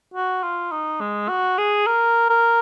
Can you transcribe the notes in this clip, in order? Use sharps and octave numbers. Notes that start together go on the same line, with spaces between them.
F#4
F4
D#4
G#3
F#4
G#4
A#4
A#4